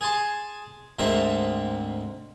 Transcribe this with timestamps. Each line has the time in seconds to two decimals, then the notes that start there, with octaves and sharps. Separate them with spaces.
0.01 G#4 G#5 A5 C6
0.99 D2 G#2 C4 A#4 E5